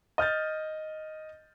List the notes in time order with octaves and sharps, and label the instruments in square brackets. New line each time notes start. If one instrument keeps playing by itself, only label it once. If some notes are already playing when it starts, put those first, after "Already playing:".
[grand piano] D#5 F6 G6 A6